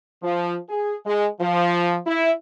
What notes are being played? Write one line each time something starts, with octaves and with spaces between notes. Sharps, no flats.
F3
G#4
G#3
F3
E4